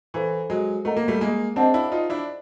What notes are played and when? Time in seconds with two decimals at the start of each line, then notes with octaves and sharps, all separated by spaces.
0.14 E3 A4 C5 F5 A#5 C#6
0.50 F#3 G#3
0.85 A3 A#4 D#5 F#5 A#5
0.97 A#3
1.08 G3 A3
1.21 G#3 A#3
1.56 C4 D4 G#4 C5 D#5 F#5 A5
1.74 D4 E4
1.92 D#4 F4
2.10 D4 E4